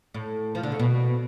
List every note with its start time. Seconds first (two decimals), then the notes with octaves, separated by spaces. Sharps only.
0.14 A2
0.55 F3
0.63 D3
0.72 C#3
0.80 B2